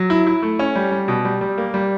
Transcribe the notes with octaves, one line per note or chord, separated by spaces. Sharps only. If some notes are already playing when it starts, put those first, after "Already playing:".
Already playing: F#3
E4
E4
A3
C#4
G3
G3
B2
G3
G3
A#3
G3